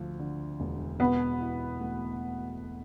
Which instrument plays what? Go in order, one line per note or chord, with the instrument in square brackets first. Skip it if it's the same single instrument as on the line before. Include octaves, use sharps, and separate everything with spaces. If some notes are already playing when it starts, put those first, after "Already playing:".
Already playing: [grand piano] D2 F3
D3
E1
[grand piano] B2 [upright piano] B3
[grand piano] E4
A3